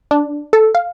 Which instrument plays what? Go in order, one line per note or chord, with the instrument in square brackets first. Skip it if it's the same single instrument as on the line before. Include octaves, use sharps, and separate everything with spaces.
[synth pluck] D4
A4
F5